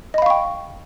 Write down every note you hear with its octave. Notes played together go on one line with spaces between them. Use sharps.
D#5 F5 G5 B5 C#6